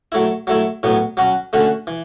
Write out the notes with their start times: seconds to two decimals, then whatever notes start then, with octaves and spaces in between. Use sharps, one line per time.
0.12 F#3 A3 E4
0.47 F#3 A3 E4
0.83 A2 F#3 B3
1.17 F#3 C#4 F#4
1.53 D3 A3 C#4 F#4
1.87 E3